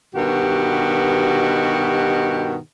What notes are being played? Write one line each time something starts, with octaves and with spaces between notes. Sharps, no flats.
G2 B2 D#3 F#4 G4